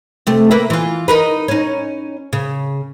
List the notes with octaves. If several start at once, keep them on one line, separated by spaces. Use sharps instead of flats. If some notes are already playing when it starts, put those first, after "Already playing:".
C3 A3
A#3 B4 E5
E3 F4
D#4 A#4 B4
C#4 D#4
C#3